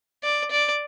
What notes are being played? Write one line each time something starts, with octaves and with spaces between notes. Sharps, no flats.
D5
D5